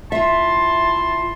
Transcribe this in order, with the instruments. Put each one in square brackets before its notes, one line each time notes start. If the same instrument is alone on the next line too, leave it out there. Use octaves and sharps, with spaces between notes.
[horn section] E4 A5 C6 [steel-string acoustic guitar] F4 E5